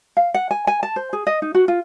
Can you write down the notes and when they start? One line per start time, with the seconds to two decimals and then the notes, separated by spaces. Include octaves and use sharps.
0.17 F5
0.34 F#5
0.51 G#5
0.67 G#5
0.83 A5
0.96 C5
1.13 G#4
1.27 D#5
1.42 D#4
1.55 F#4
1.68 F4